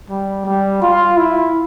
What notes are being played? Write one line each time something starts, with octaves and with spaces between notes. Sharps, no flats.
G3
G3
F4
E4